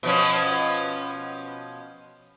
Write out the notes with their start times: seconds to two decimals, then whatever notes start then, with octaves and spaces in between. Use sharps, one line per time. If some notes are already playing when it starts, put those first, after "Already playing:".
0.03 B2 F3 C#4